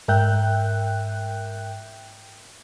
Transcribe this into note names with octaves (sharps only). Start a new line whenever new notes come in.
G#2 A#4 E5 G5 F#6 G6